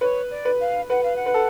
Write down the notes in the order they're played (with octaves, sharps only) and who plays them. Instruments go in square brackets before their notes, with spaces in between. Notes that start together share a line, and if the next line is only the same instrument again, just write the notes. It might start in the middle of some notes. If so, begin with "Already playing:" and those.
[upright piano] B4 [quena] C#5
[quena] D5
[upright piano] B4
[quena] F5
[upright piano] B4 [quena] F#5
[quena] F5
F#5
[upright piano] B4
A4